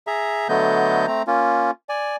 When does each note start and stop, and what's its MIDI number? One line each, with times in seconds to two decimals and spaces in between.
0.07 0.48 68
0.07 0.48 76
0.07 0.48 82
0.49 1.06 50
0.49 1.06 54
0.49 1.06 57
0.49 1.06 59
0.49 1.06 75
0.49 1.06 91
1.08 1.23 57
1.08 1.23 60
1.08 1.23 82
1.27 1.71 58
1.27 1.71 61
1.27 1.71 65
1.89 2.16 74
1.89 2.16 80